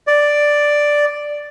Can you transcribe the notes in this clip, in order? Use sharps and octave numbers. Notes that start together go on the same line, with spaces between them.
D5